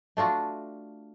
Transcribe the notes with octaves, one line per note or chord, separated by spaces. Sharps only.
A3 D4 F4 F#4